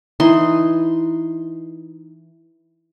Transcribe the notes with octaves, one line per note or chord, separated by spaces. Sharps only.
E3 D#4 C6